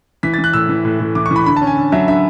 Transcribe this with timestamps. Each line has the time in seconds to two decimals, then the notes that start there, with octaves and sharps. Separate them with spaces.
0.23 E3 B6
0.34 A6
0.39 E3
0.44 F#6
0.53 A2 E6
0.69 E3
0.85 A2
1.00 A2
1.15 E3 D6
1.26 C#6
1.31 E3
1.36 B5
1.46 D3 B5
1.56 A5
1.61 C#4
1.67 G#5
1.77 D3
1.92 F#3 E5
2.08 D3 E5